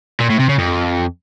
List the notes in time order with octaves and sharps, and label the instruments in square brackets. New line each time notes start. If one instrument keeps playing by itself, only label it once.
[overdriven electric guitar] A#2
A2
C3
C#3
F2